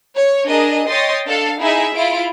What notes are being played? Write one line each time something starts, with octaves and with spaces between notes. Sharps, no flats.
C#5
D4 G#4 A#4 D#5
C#5 D#5 G5 C6 D#6 A6
D4 A4 F5
D#4 E4 G#4 E5
E4 F4 D7